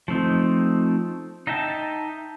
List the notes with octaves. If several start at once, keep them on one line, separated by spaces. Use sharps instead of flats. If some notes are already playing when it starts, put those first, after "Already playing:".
F3 A3 C4 D#4
D#4 D#5 E5 G5 A5